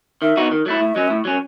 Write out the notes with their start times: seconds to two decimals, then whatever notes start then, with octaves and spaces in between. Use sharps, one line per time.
0.22 D#3 E5
0.37 F#3 B3 D#4 F#4
0.52 D#3
0.66 F#3 A3 E4
0.81 A2 E5
0.94 F#3 C#4 D#5
1.08 A2 E5
1.25 F#3 C#4